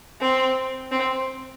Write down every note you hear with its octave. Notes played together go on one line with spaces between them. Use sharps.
C4
C4